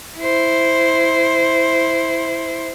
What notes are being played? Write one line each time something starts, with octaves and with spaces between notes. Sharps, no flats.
E4 C5